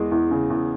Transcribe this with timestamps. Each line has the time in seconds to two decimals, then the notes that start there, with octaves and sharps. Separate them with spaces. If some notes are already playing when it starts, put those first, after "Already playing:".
Already playing: E2 G#3
0.12 E2
0.31 C#3
0.50 E2